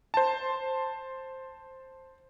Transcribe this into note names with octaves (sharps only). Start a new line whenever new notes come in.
C5 A5